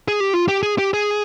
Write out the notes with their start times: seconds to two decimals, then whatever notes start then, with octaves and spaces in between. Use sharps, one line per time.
0.08 G#4
0.20 G4
0.33 F4
0.48 G4
0.63 G#4
0.78 G4
0.94 G#4